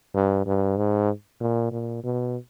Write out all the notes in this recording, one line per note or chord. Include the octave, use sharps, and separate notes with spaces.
G2
G2
G#2
A#2
A#2
B2